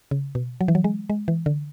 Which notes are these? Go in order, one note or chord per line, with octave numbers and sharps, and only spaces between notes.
C#3
B2
F#3
E3
F#3
G#3
G#3
E3
D3